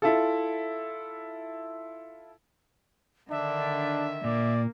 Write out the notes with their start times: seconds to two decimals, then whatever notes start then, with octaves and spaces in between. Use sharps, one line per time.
0.02 E4 F4 A4
3.30 D3 D#3 D4 E5
4.24 A#2 A#3 D5